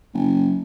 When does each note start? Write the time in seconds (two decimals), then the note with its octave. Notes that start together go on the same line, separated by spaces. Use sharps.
0.14 F#1